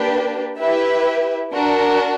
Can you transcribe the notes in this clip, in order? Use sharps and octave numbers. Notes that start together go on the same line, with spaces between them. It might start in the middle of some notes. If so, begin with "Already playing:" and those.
Already playing: A#3 D4 G4 B4
E4 G4 B4 E5
D4 F#4 A#4